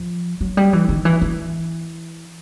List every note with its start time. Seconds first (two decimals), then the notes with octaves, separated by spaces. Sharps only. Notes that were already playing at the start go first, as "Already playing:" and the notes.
Already playing: F3
0.41 F#3
0.57 G3
0.73 E3
0.88 D#3
1.05 E3
1.21 E3